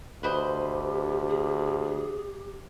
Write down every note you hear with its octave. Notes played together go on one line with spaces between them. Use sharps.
D2 G4 B4 C5 D#5
G#4